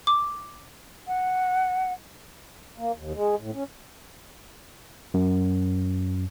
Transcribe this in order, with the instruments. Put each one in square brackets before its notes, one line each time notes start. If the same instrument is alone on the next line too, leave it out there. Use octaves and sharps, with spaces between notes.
[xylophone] D6
[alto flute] F#5
[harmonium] A#3
D#2
G#3
A2
C#4
[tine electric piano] F#2